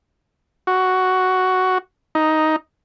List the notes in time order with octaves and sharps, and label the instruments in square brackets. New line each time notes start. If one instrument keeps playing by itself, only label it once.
[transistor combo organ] F#4
D#4